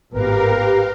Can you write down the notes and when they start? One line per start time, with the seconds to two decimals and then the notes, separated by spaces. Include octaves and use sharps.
0.13 G#1 A2 B3 G4 A#4 B4 F5